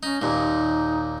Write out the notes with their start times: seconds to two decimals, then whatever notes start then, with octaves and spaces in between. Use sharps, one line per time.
0.03 C#4 D#4
0.22 D#2 A#2 D#4